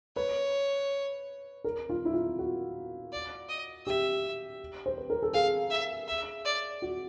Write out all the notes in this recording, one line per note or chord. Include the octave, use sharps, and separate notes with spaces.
B4 C#5
A#4
F4
E4
F4
F#4
D5
D#5
G4 E5
C5
B4
A#4
A4
G#4 F5
E5
E5
D5
F#4